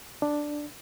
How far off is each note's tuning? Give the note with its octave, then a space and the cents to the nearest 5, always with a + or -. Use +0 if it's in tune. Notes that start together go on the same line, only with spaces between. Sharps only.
D4 +5